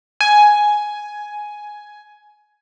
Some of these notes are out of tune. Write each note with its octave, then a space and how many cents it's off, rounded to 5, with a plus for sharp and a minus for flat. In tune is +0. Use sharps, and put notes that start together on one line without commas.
G#5 +5